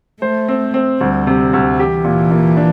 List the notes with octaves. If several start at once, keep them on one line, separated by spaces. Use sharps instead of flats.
A3 C5
C4
C4
D2 G3
C3
D2
E3 G4
A#2
A#2
D4